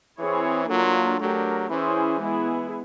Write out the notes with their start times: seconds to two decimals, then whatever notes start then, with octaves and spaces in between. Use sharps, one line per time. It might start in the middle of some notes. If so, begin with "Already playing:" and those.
0.18 E3 C4 E4 G#4 C#5
0.69 F#3 A#3 D4 F4 A4
1.20 F#3 A3 D4 G4 A#4
1.70 E3 C#4 E4 G#4 C5
2.21 G#3 B3 E4 G#4